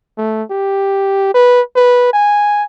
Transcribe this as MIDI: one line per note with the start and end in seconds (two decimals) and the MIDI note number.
0.18 0.43 57
0.51 1.32 67
1.34 1.61 71
1.76 2.09 71
2.13 2.63 80